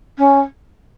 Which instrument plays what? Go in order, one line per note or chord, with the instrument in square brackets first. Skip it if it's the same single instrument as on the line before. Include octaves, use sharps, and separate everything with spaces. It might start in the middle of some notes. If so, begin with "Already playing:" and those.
[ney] C#4